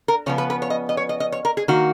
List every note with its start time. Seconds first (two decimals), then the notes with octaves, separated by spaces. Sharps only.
0.08 A#4
0.26 C#3 F3 B3 C#5
0.38 B4
0.50 B4
0.62 C#5
0.70 D#5
0.89 D#5
0.97 C#5
1.09 D#5
1.20 D#5
1.32 C#5
1.45 A#4
1.57 G#4
1.68 D#3 A#3 F#4